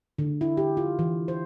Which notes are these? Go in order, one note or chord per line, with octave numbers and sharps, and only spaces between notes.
D3
E4
G4
F4
E3
C5